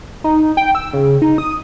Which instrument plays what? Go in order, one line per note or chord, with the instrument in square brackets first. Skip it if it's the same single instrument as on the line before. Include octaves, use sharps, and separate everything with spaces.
[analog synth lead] D#4
G5
E6
C#3
D#4
D#6